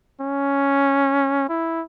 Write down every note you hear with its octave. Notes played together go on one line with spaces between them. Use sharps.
C#4
E4